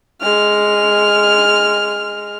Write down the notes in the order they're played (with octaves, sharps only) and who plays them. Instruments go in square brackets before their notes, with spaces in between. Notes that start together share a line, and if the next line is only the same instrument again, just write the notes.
[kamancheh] G#3 F6